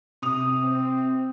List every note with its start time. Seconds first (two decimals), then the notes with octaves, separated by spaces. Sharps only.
0.22 C3 D#6 F7
0.62 C4